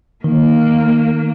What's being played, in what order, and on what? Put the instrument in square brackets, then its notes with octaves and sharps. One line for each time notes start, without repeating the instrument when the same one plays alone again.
[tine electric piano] D#3 [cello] A#3